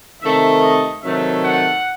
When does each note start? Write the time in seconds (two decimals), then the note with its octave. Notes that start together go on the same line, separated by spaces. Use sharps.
0.22 C3 D#3 A3 E5
0.63 D#5
1.02 C3 D#3 F#3 A3 E5
1.43 F#5